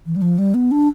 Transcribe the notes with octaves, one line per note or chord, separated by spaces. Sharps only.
E3
G3
F3
G3
B3
D4